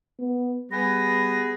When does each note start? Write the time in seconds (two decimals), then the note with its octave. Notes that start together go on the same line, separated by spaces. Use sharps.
0.19 B3
0.71 G3 B3 G#4 B4 A#6